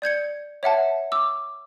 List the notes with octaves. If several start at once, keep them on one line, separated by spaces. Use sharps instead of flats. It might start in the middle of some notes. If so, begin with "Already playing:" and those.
D5 G6 G#6 C#7
C#5 E5 F#5 A5
D6 E6